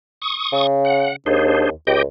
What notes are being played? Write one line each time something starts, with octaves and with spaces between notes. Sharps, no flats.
C#6 D#6
C#3
F#5
D#2 D4 G#4 C5
C#2 G4 D#5 G5